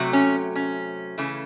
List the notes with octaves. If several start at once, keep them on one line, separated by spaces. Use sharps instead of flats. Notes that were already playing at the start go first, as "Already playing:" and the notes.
Already playing: C3 F#3 A3
C#4
C#4
C#3 E3 A3